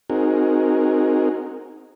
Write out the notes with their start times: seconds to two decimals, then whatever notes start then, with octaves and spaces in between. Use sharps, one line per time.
0.10 C4 D#4 F#4 G#4 A#4